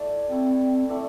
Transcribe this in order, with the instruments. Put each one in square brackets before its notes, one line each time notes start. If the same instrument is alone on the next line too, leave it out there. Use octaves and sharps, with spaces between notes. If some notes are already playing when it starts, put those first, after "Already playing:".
Already playing: [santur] A3 E4 A4 D5
[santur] A3 E4 A4 D5 [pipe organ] C4
[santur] A3 E4 A4 D5